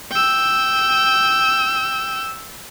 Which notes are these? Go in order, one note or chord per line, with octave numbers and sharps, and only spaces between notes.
G5 E6